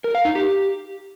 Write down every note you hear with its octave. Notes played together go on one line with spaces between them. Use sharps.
A#4
F5
D#4
G4